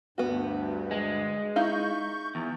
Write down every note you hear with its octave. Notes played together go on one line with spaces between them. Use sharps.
D2 G2 B3 F#4
G#3
D#4 E4 F5 C#6 G6
E2